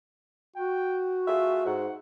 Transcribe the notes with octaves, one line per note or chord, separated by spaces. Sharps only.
F#4 G5
A3 F4 G#4 E5
G#2 F#5